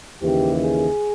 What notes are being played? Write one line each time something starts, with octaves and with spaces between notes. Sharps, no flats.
D#2 C#3 E3 G4
G#4